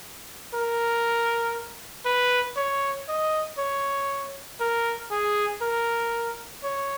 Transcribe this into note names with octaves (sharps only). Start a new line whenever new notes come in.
A#4
B4
C#5
D#5
C#5
A#4
G#4
A#4
C#5